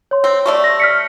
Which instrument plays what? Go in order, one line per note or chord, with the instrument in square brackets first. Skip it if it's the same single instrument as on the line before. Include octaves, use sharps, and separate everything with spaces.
[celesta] C#5 C6
[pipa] C4
[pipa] G3 A3 D5 [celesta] C#6
[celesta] A#6
F6 B6 C#7